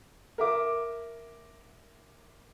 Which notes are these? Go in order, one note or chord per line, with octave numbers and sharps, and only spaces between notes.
A#4 E5 D6